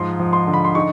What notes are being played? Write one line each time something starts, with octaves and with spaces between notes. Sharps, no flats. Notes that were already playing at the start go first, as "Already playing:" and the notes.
Already playing: G#2 F3 C6
F3
C6
D3
B5
C6
D#4 C#6